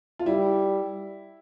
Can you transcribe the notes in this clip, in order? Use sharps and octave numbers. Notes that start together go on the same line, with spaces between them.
F4
G3 E4